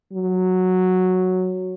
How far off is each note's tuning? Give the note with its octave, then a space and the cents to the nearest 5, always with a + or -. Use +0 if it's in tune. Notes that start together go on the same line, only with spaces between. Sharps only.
F#3 -5